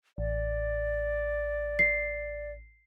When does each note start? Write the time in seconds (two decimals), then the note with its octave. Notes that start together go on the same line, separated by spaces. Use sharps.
0.18 A1 D5
1.79 C7